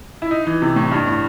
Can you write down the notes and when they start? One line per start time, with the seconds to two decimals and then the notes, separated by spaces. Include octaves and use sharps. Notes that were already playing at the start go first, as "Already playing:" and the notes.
0.22 E4
0.31 D#4
0.47 E3
0.62 C3
0.76 A2
0.91 G2
1.07 A2